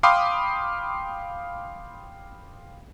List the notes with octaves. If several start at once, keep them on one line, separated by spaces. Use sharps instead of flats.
F5 G5 B5 C6 D6 D#6